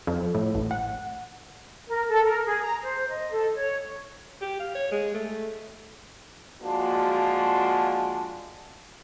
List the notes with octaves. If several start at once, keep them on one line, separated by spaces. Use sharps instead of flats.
F2
A2
A1
F#5
A#4
A4
A#4
G#4
A#5
C5
D#5
A4
C#5
G4
F5
C#5
G#3
A3
F3 G#3 A#3 D4 F#4